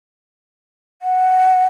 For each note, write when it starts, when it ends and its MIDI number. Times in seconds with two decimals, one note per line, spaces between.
1.02 1.67 78